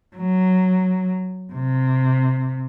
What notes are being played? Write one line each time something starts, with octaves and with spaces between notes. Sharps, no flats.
F#3
C3